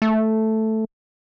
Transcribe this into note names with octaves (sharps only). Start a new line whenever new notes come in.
A3